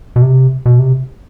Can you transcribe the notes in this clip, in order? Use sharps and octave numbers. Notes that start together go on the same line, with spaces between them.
B2
C3
B2
C3